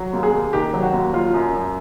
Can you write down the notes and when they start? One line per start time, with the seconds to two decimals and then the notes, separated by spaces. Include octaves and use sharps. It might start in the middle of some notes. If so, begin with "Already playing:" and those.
Already playing: F#3
0.13 D#2
0.23 G#4
0.33 D#2
0.53 D#3 G4
0.73 F#3
0.83 F#4
0.93 D#2
1.13 F#3 F4
1.34 F#2
1.53 F#2